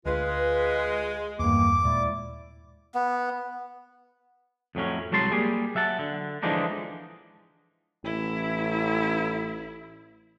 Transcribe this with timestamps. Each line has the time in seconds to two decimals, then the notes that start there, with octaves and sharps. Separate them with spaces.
0.05 D2 G#3 F4 B4
1.39 E2 G2 D#3 E3 A#3 D6
1.84 D#2 A#2 G#3 E4 D5
2.95 B3
4.75 F2 A2 F#3 C#4
5.12 C2 F#3 G#3 A5 C6
5.32 G3 A#3 G4 G#4
5.75 F#3 E5 F#5 A5
5.99 D3
6.43 D3 E3 F3 G#3 D4 D#4
8.04 A1 E4